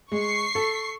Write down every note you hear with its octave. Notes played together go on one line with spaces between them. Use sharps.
G#3 C#6 C7
A4